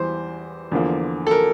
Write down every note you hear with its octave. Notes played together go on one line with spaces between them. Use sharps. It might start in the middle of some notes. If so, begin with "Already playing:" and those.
Already playing: E2 E3 G3 C5
E2 D3 F3 A#3
A4
A#4